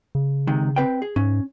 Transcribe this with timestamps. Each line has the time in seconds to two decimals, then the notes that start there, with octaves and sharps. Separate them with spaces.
0.15 C#3
0.47 C3 D#3 G#3
0.76 C4 B4 G5
1.02 G#4
1.16 G#2 C#4